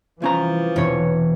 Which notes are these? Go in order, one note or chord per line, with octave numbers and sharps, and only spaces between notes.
C2 E3 F3 C#4 A#5
E1 C3 C#5